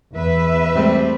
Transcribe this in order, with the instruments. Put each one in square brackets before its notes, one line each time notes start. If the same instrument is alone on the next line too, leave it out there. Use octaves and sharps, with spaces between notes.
[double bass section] E2 [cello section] B4 E5
[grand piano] G#2 A3 [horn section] G3 C4